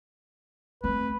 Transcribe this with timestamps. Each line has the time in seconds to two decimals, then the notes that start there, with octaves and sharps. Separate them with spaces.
0.84 A3 C4 B4